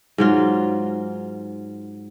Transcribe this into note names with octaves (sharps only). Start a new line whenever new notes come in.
G#2 F#3 F4